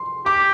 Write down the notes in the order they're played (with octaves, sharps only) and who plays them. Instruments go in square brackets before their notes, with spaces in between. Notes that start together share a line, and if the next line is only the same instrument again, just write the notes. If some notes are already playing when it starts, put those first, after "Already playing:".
Already playing: [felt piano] C6
[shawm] G4 [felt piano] D6